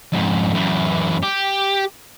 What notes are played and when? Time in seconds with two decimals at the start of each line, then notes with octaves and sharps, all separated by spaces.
0.12 F2 G#2
0.55 F#2 E3
1.23 G4